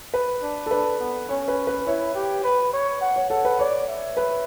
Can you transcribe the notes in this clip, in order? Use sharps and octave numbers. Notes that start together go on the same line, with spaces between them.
B4
D4
A4
D4 B4
B3
C#4 C#5
B4
B4
E4 C#5
G4
B4
C#5
F#5
C#5
A4 F#5
B4
C#5 D5
E5
B4